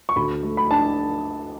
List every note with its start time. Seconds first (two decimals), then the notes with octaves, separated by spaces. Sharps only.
0.09 C#6
0.16 D2 B5
0.43 A3
0.57 B5
0.71 D4 A5